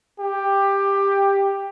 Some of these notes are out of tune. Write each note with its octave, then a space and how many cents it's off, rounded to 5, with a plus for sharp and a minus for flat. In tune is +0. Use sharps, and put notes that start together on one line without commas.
G4 +10